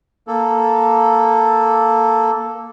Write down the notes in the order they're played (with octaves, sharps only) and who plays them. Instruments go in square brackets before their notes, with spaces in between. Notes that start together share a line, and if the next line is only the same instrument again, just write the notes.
[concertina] A#3 A4